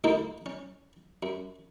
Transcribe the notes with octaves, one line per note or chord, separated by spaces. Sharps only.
D2 A#3 D#4 E4 C5
C#4
F#2